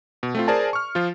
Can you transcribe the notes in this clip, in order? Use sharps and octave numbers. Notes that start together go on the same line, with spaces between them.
B2
A3 C4 F4
G#4 A#4 C5 D5 G#5 A5
C#6 F6
F3 F4